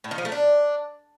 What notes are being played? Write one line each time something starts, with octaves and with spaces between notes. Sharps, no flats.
A2
D#3
F3
A3
D4